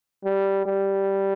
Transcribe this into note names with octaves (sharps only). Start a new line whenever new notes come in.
G3
G3